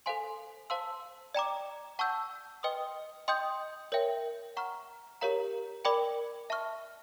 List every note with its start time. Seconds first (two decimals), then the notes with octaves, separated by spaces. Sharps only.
0.06 A4 C5 F5 G#5 C6
0.70 C5 F5 A5 C6 E6
1.34 D5 G5 A#5 D6
1.99 F#5 A5 C#6 E6 G6
2.63 B4 D#5 G5 C6 D#6
3.28 D#5 G5 C6 D#6 G6
3.92 A#4 C#5 E5 G5
4.57 F#5 A#5 C#6 F6
5.21 G4 A#4 C#5 F5 A#5
5.85 A#4 D5 G5 B5 D6
6.50 E5 A5 C#6 F6